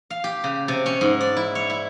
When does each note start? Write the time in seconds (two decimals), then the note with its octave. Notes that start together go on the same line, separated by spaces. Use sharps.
0.10 F5
0.24 G4
0.44 C#3
0.68 C3
0.86 C#4
1.01 G#2
1.20 D5
1.36 E4
1.55 C#5
1.70 E4